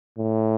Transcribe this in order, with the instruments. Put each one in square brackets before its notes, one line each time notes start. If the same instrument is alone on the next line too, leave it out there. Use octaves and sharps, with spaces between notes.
[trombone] A2